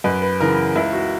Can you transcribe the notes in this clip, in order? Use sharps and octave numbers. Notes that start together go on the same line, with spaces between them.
F#2 B4
B4
C#3 E3 A#4
C#2 E4
F#4